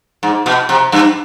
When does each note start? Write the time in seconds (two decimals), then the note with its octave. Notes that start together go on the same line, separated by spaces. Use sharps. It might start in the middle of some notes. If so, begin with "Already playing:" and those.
0.23 G#2
0.46 B2
0.69 C3
0.92 G2